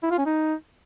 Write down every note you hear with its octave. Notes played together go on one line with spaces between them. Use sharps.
E4
F4
C#4
D#4